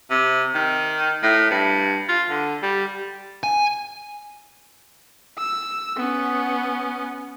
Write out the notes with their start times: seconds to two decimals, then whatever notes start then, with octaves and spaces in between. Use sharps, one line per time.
0.11 C3
0.55 D#3
1.23 A2
1.51 G2
2.09 F4
2.30 D3
2.63 G3
3.43 G#5
5.39 E6
5.97 B3 C#4